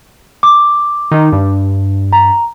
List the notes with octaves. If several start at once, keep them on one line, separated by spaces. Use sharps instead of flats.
D6
D#3 D#4
G2
A#5